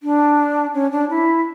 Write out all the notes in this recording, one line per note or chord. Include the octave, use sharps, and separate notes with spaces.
D4
C#4
D4
E4